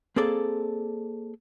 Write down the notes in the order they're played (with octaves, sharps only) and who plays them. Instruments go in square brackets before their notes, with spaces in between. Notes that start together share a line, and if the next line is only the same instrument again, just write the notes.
[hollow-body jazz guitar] A#3 C4 G#4 A4 D5